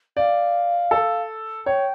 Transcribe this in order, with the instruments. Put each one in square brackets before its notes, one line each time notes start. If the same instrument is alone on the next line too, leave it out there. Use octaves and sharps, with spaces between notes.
[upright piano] D5 [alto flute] F5
[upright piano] A4
[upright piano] C#5 [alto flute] G5